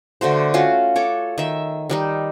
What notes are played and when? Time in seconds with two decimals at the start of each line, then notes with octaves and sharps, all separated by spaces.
0.21 D3 A3 F#4 C5
0.54 C#4 F4 F#4 F5
0.96 A4 C#5 D6
1.38 D#3 E5
1.90 D#3 G3 D#4